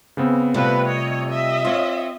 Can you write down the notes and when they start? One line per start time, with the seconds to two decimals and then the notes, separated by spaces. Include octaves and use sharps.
0.17 C#3 B3 C4
0.54 C3 F3 G3 A3 B3 C4 B4 F5
0.88 C#5 D#5
1.30 D#5 E5
1.65 C4 F4 C#5